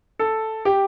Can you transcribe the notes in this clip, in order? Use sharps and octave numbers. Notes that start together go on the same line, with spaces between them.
A4
G4